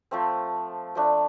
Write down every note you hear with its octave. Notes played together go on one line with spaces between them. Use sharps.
F3 A3 C4
F3 A3 D4